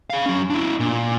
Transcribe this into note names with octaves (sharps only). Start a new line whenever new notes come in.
G#4 F5
F#3 C#4
D4 E4
A#2